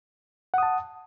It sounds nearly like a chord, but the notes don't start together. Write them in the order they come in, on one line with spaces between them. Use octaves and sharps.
F#5 D#6 A5